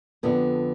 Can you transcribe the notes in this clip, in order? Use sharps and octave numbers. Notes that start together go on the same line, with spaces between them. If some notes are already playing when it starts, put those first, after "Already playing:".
F2 D3 B3